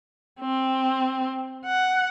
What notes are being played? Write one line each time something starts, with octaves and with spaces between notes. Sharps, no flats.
C4
F#5